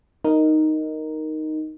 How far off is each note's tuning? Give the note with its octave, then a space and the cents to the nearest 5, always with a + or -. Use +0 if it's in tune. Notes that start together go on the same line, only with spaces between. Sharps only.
D#4 +0 A#4 +0